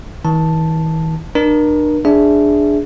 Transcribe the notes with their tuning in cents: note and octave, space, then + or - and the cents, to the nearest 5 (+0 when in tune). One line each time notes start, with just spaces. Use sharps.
E3 -45 A5 +0
D4 +40 A#4 +30
D4 +0 G#4 +0 E5 +0